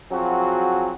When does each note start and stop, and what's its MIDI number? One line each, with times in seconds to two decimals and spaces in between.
0.12 0.92 53
0.12 0.92 54
0.12 0.92 60
0.12 0.92 66
0.12 0.92 68